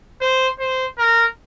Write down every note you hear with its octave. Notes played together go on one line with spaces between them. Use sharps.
C5
C5
A#4